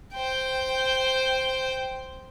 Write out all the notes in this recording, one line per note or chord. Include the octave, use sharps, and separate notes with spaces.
C5 G5